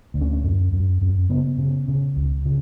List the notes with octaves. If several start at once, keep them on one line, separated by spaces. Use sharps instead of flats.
D2
C#4
F#2
F#2
F#2
C#3 B3
C#3
C#3
C#2
C#3